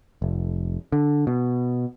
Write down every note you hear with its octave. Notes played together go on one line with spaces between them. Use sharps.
F1
D3
B2